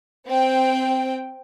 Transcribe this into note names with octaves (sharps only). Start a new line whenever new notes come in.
C4 G5